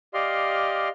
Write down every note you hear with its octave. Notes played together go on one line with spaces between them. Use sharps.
G4 D5 D#5 F5 C6 F6